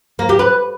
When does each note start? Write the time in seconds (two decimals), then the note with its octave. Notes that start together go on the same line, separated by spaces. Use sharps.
0.19 A#3
0.29 G4
0.39 B4